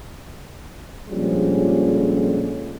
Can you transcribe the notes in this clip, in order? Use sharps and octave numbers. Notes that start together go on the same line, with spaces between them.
A#1 D3 F3 G3 G#3 C#4